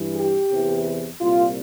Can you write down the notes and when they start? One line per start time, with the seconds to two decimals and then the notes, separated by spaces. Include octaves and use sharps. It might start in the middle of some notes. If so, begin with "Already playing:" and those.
Already playing: G2 E3
0.16 G4
0.51 E2 C3 E3
1.21 C2 A#2 F4